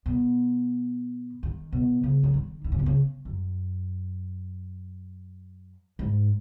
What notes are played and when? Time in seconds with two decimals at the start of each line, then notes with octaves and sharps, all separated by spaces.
0.06 B2
1.43 D#3
1.72 B2
2.03 C#3
2.23 F#3
2.34 D#3
2.64 D#3
2.72 C#3
2.79 B2
2.86 C#3
3.25 F#2
5.99 G#2